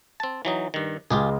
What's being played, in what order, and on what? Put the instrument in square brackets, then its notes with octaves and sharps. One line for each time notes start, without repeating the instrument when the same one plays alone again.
[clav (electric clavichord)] C4 A5
E3 F#3 D#4
G2 D#3
[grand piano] C#2 G#3 [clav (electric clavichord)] F4 G4 G#4